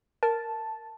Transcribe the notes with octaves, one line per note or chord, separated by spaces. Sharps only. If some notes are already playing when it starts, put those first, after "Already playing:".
A#4 A5